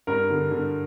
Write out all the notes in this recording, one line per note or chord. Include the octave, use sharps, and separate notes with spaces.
G2 A#4
D3
D3